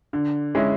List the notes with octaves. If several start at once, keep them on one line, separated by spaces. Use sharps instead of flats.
D3
G#3 C#4 E4